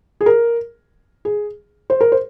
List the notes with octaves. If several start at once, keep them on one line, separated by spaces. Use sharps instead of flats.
G#4
A#4
G#4
C5
A#4
C5